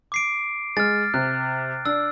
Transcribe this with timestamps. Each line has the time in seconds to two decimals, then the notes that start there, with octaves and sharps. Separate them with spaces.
0.12 D6 C7 D7
0.77 G#3 F6 A6
1.14 C3 F#6
1.85 D4 E6